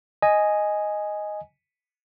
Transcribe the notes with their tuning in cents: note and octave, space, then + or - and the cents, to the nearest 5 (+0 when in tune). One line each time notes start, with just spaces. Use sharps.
D#5 +0 G#5 +0